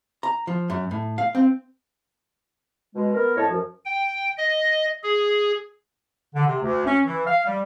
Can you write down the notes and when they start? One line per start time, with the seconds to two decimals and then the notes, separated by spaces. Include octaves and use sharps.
0.23 A#5
0.47 F3
0.70 F#2
0.91 A2
1.18 F5
1.35 C4
2.95 B2 G#3
3.14 B3 A#4
3.36 F2 A2 C#5 D#5 A5
3.48 F#2 F3
3.85 G5
4.37 D#5
5.04 G#4
6.35 D3
6.47 C3
6.61 D2
6.86 C#4
7.06 E3
7.27 F5
7.46 G3